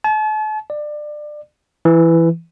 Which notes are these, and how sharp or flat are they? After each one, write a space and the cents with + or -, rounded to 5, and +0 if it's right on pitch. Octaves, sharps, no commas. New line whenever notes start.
A5 -40
D5 +25
E3 +10